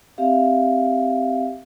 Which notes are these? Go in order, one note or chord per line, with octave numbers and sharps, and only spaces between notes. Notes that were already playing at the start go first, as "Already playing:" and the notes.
C4 G4 E5 F5